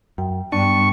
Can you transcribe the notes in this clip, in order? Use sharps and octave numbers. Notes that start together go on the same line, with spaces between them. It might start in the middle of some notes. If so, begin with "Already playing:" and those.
F#2 G5
G2 B3 D4 G5 C#6